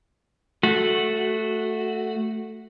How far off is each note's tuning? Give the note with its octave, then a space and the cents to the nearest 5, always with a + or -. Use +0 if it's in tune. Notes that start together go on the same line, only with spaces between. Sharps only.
A3 +0 F#4 +0